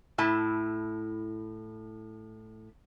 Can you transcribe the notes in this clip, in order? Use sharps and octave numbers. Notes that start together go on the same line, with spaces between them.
A2 E4 A5